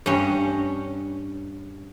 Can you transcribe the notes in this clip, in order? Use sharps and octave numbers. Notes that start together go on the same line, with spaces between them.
G2 C#4